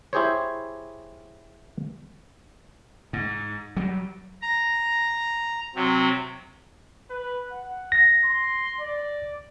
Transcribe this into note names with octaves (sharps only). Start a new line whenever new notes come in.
E4 G4 G#4 C5 C#5
G#2
F#3 G3
A#5
C3 F#3 C4
B4
F#5
A#6
C6
D5